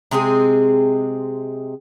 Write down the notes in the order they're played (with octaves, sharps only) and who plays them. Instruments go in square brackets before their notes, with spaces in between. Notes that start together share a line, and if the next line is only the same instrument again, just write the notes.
[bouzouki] C3 G#3 C4 G#4